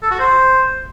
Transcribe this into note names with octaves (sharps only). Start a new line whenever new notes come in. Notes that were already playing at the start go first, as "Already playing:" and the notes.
A4
F#4
C5